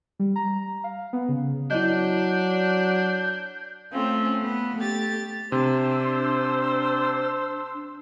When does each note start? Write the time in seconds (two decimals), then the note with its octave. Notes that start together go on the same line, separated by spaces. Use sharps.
0.19 G3
0.36 A#5
0.84 F5
1.13 B3
1.29 C#3
1.70 F#3 D4 E4 D#5 G6
3.92 A3 C4 C#4 F4
4.41 B3
4.77 A3 G4 A6
5.52 C3 D4 C5 C6 E6